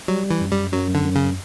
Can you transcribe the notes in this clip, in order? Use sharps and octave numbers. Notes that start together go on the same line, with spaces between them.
F#3 G3
E3
F#2
G3
F#2 F#3
D3
F#2
C#3